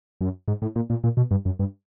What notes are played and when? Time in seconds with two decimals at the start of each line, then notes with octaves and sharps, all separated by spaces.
0.21 F#2
0.48 G#2
0.62 A2
0.76 A#2
0.90 A#2
1.04 A#2
1.17 B2
1.31 G2
1.45 F#2
1.59 G2